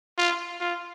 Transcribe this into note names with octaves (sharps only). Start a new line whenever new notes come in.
F4
F4